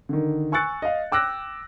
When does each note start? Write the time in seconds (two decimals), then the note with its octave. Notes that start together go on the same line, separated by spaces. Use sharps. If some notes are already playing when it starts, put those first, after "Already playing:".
0.09 D3 D#3
0.52 G#5 C#6 E6 F#6 A6 C#7
0.82 D#5 F5
1.12 G5 D6 E6 F#6 A#6